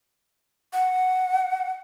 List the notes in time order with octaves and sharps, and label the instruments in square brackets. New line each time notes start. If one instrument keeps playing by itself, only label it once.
[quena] F#5